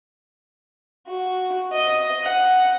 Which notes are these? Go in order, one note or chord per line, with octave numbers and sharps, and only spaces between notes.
F#4
D#5
F#5